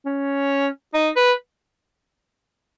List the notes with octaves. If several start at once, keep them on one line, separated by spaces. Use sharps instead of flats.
C#4
D#4
B4